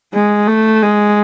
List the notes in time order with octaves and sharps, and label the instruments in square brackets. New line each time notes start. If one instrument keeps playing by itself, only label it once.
[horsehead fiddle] G#3
A3
G#3